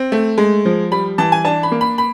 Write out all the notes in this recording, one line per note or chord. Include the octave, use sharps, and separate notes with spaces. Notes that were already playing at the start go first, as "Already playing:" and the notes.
Already playing: C4
A3
G#3
F3
G3 B5
E3 A5
G#5
D4 A5
B5
A#3
B5
B5